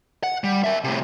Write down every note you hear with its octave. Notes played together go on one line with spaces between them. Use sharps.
F#5
G3
A#4 E5
A2 C3